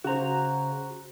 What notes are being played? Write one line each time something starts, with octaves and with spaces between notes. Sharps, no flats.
C#3 F#4 C5 A#5